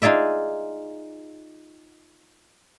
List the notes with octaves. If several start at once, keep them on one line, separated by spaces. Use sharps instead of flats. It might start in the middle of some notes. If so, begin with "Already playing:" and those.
D#4 F4 G#4 D5 E5